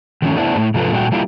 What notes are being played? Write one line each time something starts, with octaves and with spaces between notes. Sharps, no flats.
D#3 F3 A3 A#3 C#4
A3 B3 D4 E4 C5
A2 A3
G#2 C3 F3 F4 A4 B4
A#2 G3 A3 C4 F#4 G5
G3 A#3 E4 F4 G4